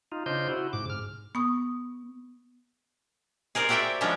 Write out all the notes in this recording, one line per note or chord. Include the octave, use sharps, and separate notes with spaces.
D#4 F4
C#3 D4 F4 C5 D#5 G6
E4 F#4
G#2 C3 D6
G#2 F6
B3 C#6 D#6
G#4 A#4 C5 D5
C4 F#4 G4 D5 E5 G5
F3 G3 G#3 C#4 D4